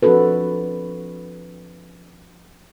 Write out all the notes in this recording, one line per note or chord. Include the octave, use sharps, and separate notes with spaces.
F3 C4 D4 F#4 A4 B4